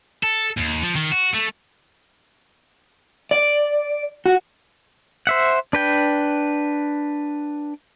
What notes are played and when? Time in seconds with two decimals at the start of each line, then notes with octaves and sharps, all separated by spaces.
0.23 A4
0.58 D#2
0.83 F3
0.96 D#3
1.12 F#4
1.34 A3
3.31 D5
4.26 F#4
5.27 C5 E5 F#5
5.73 D4 B4 G5